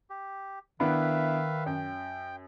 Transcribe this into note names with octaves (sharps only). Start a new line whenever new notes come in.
G4
D#3 B3 D4 E4 B4 E5 F5
F#2 G5